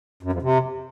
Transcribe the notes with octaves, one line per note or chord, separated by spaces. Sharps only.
F#2
F2
C3